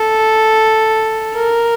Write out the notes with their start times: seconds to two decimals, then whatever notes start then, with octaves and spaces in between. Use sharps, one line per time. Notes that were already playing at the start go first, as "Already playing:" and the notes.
Already playing: A4
1.34 A#4